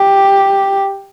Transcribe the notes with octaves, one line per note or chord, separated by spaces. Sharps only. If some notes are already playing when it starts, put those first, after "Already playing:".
Already playing: G4